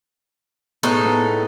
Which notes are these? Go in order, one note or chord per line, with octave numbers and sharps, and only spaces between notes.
A2 B3 D#4 G#4 A4 F#6
B3